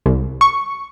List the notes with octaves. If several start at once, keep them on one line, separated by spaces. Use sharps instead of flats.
C2
C#6